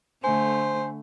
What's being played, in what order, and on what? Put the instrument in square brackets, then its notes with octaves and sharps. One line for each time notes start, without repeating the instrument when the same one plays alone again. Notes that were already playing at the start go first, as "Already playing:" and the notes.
[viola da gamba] D3 A3 [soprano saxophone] C5 [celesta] G#5